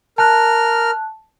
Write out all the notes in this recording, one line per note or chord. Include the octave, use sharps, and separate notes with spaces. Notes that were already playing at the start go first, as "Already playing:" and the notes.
A#4 A5 F6 F#6